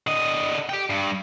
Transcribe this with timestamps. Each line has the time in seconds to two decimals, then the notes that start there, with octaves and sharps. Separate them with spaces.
0.07 D3 D#5
0.69 G4 G5
0.90 G2